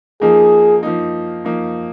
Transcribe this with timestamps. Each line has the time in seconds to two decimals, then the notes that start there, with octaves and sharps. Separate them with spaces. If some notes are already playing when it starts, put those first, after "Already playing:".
0.21 F3 A#3 D#4 G#4
0.83 F3 A#3 D#4
1.45 F3 A#3 D#4